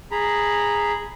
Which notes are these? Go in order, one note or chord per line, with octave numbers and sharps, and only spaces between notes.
G#4 A#5 B5